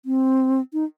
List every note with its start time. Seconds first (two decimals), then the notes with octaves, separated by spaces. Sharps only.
0.05 C4
0.73 D#4